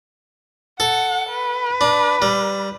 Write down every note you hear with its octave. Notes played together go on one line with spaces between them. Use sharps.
A4 F#5
B4
D4
G3